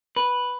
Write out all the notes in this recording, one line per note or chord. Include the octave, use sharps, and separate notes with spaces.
B4